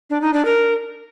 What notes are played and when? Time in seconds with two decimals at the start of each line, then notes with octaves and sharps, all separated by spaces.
0.10 D4
0.22 D#4
0.33 D4
0.45 A#4